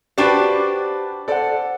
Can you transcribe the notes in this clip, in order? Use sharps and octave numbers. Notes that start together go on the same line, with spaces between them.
D4 F#4 G4 B4 C5 D5 G5 C7
A4 C5 D5 F#5